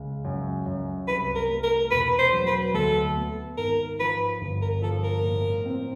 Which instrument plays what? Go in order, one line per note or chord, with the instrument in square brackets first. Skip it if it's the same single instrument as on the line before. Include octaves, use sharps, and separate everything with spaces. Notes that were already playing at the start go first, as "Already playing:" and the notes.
Already playing: [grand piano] C#2
F#2
F#2
[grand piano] C2 [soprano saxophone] B4
[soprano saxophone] A#4
[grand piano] A3
[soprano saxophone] A#4
[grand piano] E1 [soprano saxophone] B4
[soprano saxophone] C5
[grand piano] F#3
[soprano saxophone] B4
[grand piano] D2 [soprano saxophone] A4
[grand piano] B3
[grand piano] G#1 [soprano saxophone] A#4
[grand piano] F3 [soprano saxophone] B4
[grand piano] G1
[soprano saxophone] A#4
[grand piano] F3 [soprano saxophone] A4
[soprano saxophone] A#4
[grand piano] A2
C4